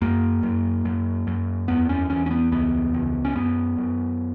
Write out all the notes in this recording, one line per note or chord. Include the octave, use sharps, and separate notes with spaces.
F#2 A#3
F#2
F#2
F#2
E2 B3
C#4
E2 C#4
C#4
B3
C#2 B3
C#2
C#4
F#2 B3
F#2